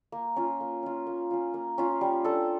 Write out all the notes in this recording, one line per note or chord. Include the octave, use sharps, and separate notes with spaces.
A#3
C#4 F4
A#3
C#4 F4
A#3
C#4 F4
A#3
C#4 F4
G3
D4 A4